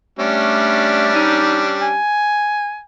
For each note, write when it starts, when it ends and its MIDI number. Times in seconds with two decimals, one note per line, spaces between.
0.19 1.98 55
0.19 1.13 57
0.19 1.98 61
0.19 1.98 62
1.15 1.62 63
1.82 2.82 80